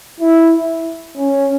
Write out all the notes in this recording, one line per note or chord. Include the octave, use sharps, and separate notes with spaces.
E4
C#4